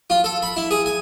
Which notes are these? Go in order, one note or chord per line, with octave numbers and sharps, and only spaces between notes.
F4
A4
B5
E4
G#4
G#5